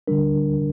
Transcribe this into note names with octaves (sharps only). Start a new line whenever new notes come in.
D3 G3 D4 A#4